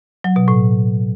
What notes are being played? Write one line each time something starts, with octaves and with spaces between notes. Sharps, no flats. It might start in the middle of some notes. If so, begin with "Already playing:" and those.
F#3
B2
A2